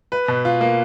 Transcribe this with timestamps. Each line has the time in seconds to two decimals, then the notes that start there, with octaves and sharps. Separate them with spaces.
0.12 B4
0.28 B2
0.45 F4
0.61 A#3